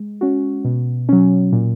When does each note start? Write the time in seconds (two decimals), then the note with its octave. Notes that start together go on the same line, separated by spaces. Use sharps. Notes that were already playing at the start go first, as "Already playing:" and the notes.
Already playing: G#3
0.21 C#4 F#4
0.65 B2
1.09 F#3 C#4
1.52 A#2